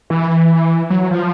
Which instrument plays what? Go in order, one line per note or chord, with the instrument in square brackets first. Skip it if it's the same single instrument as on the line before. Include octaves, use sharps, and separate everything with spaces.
[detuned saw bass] E3
F#3
F3